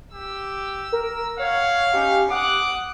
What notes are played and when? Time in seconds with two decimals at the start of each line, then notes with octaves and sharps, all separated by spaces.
0.14 G4 E6
0.92 A#4
1.39 C#5 F5 F#5
1.94 C#4 D#4 G4
2.31 F#5 D6 D#6 F#6